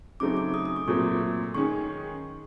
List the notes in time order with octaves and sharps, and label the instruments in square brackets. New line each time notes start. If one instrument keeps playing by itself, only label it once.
[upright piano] C#3 F#3 A3 C4 D#4 [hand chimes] D6
[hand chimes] D6
D#6
D#6
D6
[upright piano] A#2 F#3 A3 C4 [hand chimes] C#6
[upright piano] D#3 G#3 C#4 [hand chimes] C#6